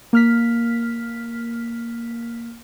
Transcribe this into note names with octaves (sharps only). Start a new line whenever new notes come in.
A#3 F6 B6